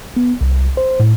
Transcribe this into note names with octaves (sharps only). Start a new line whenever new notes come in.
B3
C2
C5
A2